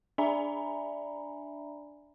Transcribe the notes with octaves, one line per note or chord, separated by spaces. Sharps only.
D4 D5 E5 G#5 A#5 B5